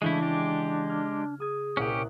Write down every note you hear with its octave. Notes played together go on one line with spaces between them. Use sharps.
C#3 E3 G#3 A3 D4 E4
G#3 G4 A5
F6 G#6
G#4 D#6 G#6
C2 A#2 C#4 G4 F#5